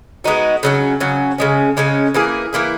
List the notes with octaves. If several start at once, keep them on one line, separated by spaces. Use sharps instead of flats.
G#3 B3 D#4 F#4
C#3 F#3 C#4
C#3 F#3 C#4
C#3 G#3 C#4
C#3 G#3 C#4
E3 A#3 E4 G#4
E3 A#3 E4 G#4